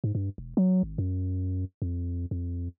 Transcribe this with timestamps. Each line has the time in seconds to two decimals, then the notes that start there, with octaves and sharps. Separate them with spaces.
0.04 G#2
0.15 G2
0.38 E1
0.57 F#3
0.83 G#1
0.98 F#2
1.82 F2
2.31 F2